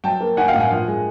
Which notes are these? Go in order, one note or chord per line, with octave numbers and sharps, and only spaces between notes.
F#3 G5 A5
A#3
D#4 F#5 G#5
F5 G5
A2
F#5 G#5
F3
G#3